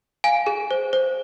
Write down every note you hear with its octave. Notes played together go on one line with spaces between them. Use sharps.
F5 G#5
G#4
C5
C5